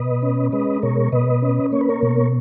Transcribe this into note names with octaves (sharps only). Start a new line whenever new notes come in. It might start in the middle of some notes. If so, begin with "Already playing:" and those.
Already playing: B2 B4 D#5
C#4
G#3 B4 D#5
B2 A#4 C#5
B2 B4 D#5
C#4
A#3 C#5
B4
A#4 C#5
B2